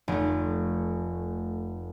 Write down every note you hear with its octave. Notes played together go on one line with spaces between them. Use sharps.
F1 A3